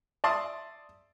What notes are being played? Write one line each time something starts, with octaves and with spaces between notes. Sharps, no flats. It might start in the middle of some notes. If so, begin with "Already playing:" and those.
D5 E5 A5 C6 D#6